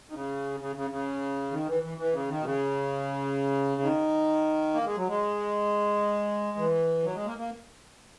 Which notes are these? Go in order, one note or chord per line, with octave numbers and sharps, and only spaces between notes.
D#3
C#3
C#3
C#3
C#3
D#3
E3
E3
E3
C#3
D#3
B2
C#3
D#3
A#3
G#3
F#3
G#3
E3
F#3
G#3
A#3
A#3